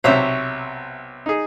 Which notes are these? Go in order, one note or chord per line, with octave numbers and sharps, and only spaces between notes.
B1 C3 C5 C#5 E5
D#4 G#4